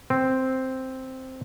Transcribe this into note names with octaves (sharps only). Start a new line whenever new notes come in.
C4